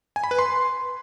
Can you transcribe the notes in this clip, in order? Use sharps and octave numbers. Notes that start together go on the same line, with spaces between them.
G#5
B5
B4
C6